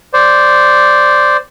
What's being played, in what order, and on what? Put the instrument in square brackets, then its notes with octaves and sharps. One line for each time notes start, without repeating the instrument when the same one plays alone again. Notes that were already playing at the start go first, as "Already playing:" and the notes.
[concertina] C5 D5